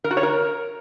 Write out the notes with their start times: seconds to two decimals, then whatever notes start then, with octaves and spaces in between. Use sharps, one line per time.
0.04 A#4
0.11 F#4
0.17 C#5
0.23 A#4